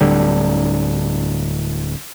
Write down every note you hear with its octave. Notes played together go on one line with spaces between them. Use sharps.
D1 D3 G3